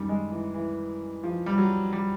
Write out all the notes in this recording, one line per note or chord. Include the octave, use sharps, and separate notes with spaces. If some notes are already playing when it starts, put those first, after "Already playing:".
Already playing: F#2 D#3 G3
G#3
E3
E3
F3
G3
F#3
G3